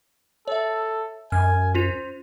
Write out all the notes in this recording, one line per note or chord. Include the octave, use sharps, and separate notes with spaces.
A4 C#5 E5
F#2 G#5 F6
C#4 F4 C5 F7